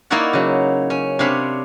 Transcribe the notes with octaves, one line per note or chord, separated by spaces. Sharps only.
A#3 D#4 E4 C#5 D5 F#5
C#3 F#3
C#4
C3 C4 D4 C#5 F5 B5